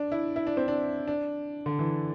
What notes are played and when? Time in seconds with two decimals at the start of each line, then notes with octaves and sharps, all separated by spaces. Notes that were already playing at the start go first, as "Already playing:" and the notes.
Already playing: D4
0.12 E4
0.36 E4
0.47 D4
0.57 C4
0.68 D4
1.07 D4
1.66 D3
1.79 E3